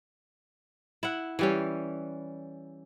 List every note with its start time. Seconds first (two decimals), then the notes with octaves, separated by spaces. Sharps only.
1.03 E4 F#5
1.39 E3 G3 C#4